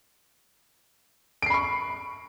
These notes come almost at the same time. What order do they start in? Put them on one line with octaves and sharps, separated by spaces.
D7 C7 B5 C#6